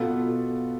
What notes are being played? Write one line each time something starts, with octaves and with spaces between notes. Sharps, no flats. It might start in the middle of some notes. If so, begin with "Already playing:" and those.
Already playing: B2 B3 F4 A4